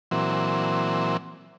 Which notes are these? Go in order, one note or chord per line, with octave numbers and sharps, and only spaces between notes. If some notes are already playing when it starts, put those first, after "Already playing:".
A#2 E3 F#3 C4